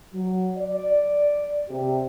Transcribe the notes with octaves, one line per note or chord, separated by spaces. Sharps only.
F#3
D5
C3 G4